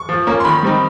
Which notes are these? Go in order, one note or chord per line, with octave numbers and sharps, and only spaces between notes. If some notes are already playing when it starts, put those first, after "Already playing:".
Already playing: C#6
F3
A#3 C#4
C6
D#3 B5
G3 C4 D#4